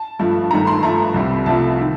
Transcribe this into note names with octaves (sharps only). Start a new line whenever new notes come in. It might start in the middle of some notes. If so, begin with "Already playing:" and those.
Already playing: A5
G2 F3 A3
G2 D#3 A3 A#5
C6
G2 F3 A3 A#5
C2 C3 G3
C2 C3 F3 A3 A5
D#3